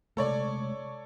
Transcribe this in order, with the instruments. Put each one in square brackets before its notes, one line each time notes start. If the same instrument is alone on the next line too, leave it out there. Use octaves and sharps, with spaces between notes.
[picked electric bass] C3 G#3 A3 [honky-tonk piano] A4 C#5 D5